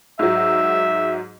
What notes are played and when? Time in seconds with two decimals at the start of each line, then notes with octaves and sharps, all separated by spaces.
0.19 G#2 F#3 E5